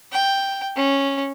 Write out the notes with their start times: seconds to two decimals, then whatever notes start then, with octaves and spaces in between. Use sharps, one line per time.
0.12 G5
0.76 C#4